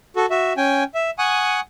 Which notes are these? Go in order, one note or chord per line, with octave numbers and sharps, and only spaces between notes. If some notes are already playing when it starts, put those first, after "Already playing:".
F#4 A4
F#4 E5
C#4 G5 G#5
E5
F#5 G#5 C#6 D#6